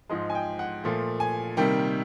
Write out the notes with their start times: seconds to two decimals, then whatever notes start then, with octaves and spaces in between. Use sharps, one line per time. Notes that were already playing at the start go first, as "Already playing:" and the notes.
0.10 G#2 F3 G#3 D#5
0.30 G#5
0.35 G5
0.59 F#5
0.84 A#2 F3 A3
1.20 G#5
1.57 C3 D#3 G3 A#3 G5